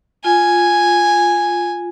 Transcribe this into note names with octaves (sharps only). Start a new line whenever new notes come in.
F4 G#5